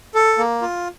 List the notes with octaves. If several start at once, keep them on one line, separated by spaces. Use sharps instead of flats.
A4
A#3
F4